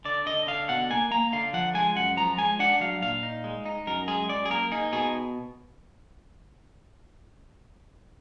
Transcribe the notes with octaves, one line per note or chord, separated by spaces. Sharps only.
D3 D5
D3 D#5
D3 F5
B2 F#5
A#3 G#5
A#3 A#5
D3 F5
F3 F#5
G#3 G#5
F#2 F#5
F3 A#5
G#3 G#5
D4 F#5
F#3 F5
A#2 F5
D#4
G#3
D#4
F#2 A#4
G#3 G#4
F#2 D5
G#4
A#3 A#4
D#4 G#4
B2 G#4